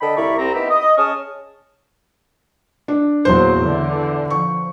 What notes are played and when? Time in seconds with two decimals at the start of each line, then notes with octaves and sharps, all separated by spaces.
0.01 D3 A4 D#5 G5 B5
0.16 C2 E4 A#4 D5 B5 C#6
0.38 C2 C4 A#5
0.54 B3 D#4 E4 G4 B5
0.70 D#5
0.98 C#4 G#4 A5 C#6 D#6 F6
2.88 D4
3.25 E2 A#2 F#3 C5 C6
3.63 D3 E3
4.30 F3 C#6